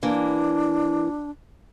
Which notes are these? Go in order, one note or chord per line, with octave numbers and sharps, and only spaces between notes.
E3 A#3 D4